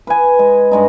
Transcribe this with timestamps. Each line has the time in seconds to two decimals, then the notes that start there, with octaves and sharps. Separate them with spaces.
0.07 B4 G#5
0.39 G#3
0.71 G2 G#3 D#4